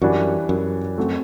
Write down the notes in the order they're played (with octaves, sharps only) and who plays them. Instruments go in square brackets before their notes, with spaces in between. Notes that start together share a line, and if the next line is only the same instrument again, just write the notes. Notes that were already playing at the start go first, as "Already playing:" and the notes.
[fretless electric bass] F#2 [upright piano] E3 G3 D4 F#4
[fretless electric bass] F#2
[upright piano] A3 C4 F#4 A4